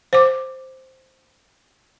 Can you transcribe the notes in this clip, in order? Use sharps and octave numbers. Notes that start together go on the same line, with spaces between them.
C5 D6